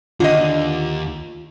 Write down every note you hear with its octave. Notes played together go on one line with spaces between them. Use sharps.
D#2 D3 F4 D#5